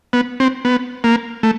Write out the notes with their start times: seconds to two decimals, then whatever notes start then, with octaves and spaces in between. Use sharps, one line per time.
0.13 B3
0.40 C4
0.65 B3
1.04 A#3
1.43 A3